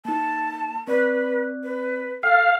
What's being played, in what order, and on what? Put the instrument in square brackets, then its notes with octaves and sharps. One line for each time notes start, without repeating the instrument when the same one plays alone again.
[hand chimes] A#3 D#4 [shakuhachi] A5
[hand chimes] C4 D5 F#6 [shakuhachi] B4
[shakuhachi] B4
[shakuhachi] A4 [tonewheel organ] F5 [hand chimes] G5